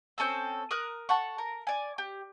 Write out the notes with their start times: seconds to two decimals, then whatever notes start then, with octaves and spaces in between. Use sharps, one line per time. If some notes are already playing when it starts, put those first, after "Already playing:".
0.18 C4 C#4 A4 E6
0.71 A#4 D#6 F#6
1.09 A4 F#5 C#6
1.38 A#4
1.67 D5 G#5
1.98 G4